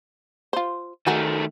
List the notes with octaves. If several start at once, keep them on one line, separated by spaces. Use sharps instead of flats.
F4 C5
D#3 A3 F#4 G#4 A#4